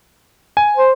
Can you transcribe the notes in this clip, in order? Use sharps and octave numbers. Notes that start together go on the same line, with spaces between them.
G#5
C5